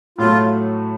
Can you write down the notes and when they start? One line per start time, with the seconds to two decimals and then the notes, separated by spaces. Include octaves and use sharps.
0.18 A2 F#3 A3 F4